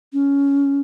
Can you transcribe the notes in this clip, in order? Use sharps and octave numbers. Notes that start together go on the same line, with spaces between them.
C#4